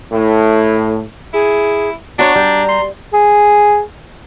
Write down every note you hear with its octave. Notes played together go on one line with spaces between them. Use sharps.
A2
E4 G#4
D4 F#4 C#5 A#5
G3
C6
G#4